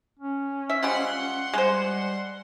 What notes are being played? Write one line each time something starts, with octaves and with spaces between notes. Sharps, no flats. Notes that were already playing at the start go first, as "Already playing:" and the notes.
C#4
E5
F3 G3 G#3 F#5 C6
G3 G#3 C5